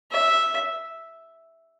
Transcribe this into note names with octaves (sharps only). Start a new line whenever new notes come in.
E5